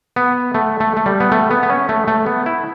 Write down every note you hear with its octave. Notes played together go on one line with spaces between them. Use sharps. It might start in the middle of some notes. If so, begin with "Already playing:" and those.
B3
A3
A3
A3
G3
B3
A3
B3
B3
C#4
A3
A3
B3
E4